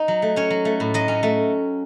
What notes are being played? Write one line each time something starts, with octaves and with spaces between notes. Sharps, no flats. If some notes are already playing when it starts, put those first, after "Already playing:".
Already playing: D#4
F#3
A3
C#4 C#5
F#3
A3
A2
F#3 D#5
C#4
A3